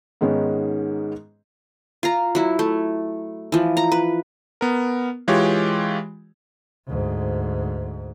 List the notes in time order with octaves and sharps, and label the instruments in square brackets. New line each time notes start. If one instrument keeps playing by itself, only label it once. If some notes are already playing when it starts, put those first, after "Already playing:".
[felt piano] G#2 D#3 G#3 B3 C#4
[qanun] F4 A#5
F#3 E4
A3
E3 F3
A#5
B4
[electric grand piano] B3 A#4
E3 G#3 F4 G4 C#5
[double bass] D2 G#2